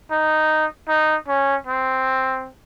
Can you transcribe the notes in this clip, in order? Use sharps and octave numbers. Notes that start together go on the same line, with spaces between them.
D#4
D#4
C#4
C4